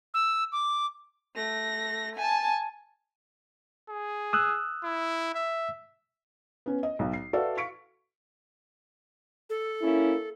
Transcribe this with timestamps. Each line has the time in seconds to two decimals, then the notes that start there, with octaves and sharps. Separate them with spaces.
0.14 E6
0.52 D6
1.35 A3 A#6
2.16 G#5 A5
3.89 G#4
4.33 D#6 E6 F#6
4.84 E4
5.35 E5
6.66 B3 C#4
6.83 D#5
6.99 B1
7.13 C7
7.33 F#4 A4 B4 D5 E5 F5
7.57 F5 C#6 B6 C#7 D7
9.50 A4
9.82 A#3 C#4 E4